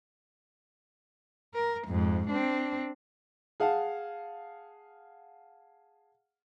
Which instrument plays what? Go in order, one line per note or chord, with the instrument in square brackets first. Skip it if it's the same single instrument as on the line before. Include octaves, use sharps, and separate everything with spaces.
[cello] A#4
F2 G#2
C4 D4
[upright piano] G#4 F5 F#5 A5